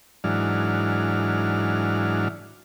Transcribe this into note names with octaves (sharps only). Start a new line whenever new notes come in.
G#2 E3 F#3 D4 F6